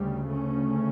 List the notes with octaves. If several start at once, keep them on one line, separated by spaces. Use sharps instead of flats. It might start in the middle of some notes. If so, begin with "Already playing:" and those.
Already playing: D2 C#3 G3
A3 C#4